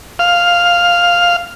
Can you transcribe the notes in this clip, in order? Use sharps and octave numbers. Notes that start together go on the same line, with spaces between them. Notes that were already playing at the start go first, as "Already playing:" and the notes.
F5